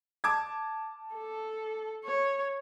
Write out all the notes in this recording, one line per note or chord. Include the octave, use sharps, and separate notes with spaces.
A5 D6 G#6
A4
C#5